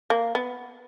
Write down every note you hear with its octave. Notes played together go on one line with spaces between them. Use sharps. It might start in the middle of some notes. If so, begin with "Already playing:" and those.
A#3
B3